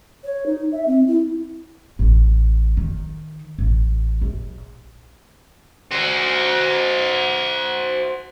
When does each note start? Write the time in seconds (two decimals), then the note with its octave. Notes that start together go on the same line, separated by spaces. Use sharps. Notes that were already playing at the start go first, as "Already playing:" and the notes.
0.24 C#5
0.46 D#4
0.72 E5
0.87 C4
1.07 E4
1.99 A1
2.77 D#3
3.59 A1
4.22 A#1
5.91 F#4 C5